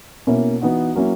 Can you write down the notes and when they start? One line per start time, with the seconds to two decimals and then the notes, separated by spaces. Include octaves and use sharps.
0.27 B2 A#3 C#4 E4
0.61 E3 B3 D#4 F#4
0.95 F#3 A#3 C#4 E4